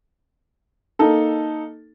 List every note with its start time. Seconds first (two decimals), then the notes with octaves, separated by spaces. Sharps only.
0.99 A#3 D#4 A4